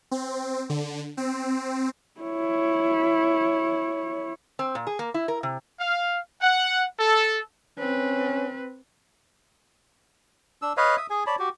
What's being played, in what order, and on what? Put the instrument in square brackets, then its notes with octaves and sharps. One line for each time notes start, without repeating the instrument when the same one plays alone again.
[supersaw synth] C4
D3
C4
[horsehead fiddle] E4 C#5
[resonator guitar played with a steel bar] C4
A#2
G#4
A#3
E4
A#4
C3
[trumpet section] F5
F#5
A4
[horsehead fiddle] C4 B4 [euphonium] C#4
[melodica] D4 E6
B4 C#5 D#5 F5
E5 D#6
G#4 G#5
C#5 D5 A5 B5
F#4 G4